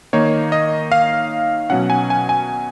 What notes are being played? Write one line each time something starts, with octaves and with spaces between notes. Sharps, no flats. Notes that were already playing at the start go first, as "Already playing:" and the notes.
D#3 A#3 D#4 C#5
D#5
F5
B2 F#3 C#4 F#5
G#5
G#5
G#5